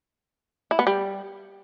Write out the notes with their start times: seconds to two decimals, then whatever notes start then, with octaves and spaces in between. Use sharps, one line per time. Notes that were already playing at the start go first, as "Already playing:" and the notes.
0.71 E4
0.79 B3
0.87 G3